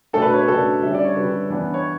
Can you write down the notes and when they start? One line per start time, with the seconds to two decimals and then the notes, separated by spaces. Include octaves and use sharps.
0.13 B2 A3 D4 A4
0.22 B4
0.34 C#5
0.40 B4
0.48 B2 A3 D4 A4
0.82 D3 G3 C#4 E5
0.94 D5
1.05 C#5
1.15 D3 G3 C#4 B4
1.50 E3 B3 D4
1.74 C#5